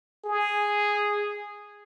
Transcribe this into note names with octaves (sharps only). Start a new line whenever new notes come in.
G#4